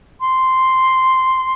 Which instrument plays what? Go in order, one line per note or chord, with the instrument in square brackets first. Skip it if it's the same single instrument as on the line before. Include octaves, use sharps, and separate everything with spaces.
[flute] C6